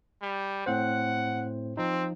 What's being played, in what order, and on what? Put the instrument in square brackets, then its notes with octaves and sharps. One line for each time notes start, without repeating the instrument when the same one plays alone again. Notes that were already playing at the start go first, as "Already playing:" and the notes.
[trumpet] G3
[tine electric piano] A2 C4 C5 [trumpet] F#5
[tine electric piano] F3 D#4 [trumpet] C4